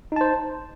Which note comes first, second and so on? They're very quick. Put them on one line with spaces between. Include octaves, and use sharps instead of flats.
D#4 A5 C5